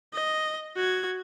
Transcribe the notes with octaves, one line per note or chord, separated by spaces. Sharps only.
D#5
F#4 G#6